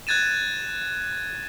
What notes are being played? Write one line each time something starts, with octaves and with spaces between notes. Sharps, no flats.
F#6 G#6 A6 D#7 E7